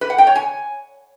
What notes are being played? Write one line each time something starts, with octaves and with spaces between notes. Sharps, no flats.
B4
F#5
G5
C#5
G#5